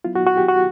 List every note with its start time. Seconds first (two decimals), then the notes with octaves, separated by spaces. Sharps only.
0.04 F#3 B3 E4 F4
0.15 F#4
0.27 F#4
0.37 G4
0.48 F#4